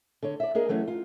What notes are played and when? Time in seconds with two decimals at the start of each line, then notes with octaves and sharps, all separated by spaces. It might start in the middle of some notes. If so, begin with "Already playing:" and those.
0.22 D3 C#5
0.40 D5 E5
0.55 A#3 D4 G#4 A#4 D#5
0.69 E3 F#3 A3 C#4
0.88 F4